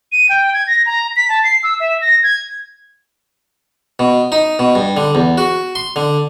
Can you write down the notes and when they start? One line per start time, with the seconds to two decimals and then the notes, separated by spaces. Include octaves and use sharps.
0.12 D#7
0.29 G5
0.53 G#6
0.67 A#6
0.86 A#5
1.16 B6
1.29 A5
1.44 C7
1.63 E6
1.80 E5
2.01 A#6
2.23 G#6
3.99 B2
4.32 D#4
4.59 B2
4.75 G2
4.97 D3
5.15 E2
5.38 F#4
5.75 C6
5.96 D3